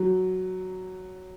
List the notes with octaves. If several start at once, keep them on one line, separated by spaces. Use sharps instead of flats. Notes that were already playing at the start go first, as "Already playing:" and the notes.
Already playing: F#3